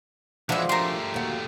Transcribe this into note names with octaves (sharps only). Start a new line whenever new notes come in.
E3 F3 G#3 D4 E4 F#4 E5
A3 G4 A#4 C6
D#2 F#4